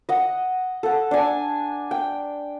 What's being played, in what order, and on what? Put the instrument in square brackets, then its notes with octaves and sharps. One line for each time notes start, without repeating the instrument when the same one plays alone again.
[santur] D#5 F#5
A4 F#5
D4 G#5
G5